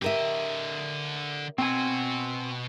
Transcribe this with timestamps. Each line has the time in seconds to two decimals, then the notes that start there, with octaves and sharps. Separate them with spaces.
0.02 D3 G4 A#4 D#5 E5
1.58 B2 C4 F#4 G#5